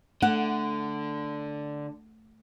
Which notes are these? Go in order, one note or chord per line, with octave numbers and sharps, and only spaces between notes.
D3 A3 F#5